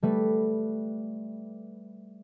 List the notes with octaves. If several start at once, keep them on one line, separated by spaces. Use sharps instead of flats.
G3 A3 B4